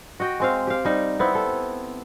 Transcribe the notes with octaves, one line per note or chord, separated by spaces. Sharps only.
F#4 D#5 G5
G#3 C4 F5
G4 F5
G3 D#4
B3 C4 E4
A4